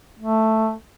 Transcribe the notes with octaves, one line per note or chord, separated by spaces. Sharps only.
A3